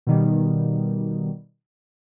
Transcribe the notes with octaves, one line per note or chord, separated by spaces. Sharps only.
B2 D#3 G3